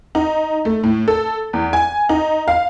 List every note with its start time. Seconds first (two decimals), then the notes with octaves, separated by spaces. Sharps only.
0.15 D#4
0.65 A3
0.83 A2
1.08 A4
1.53 E2
1.73 G#5
2.09 D#4
2.48 F5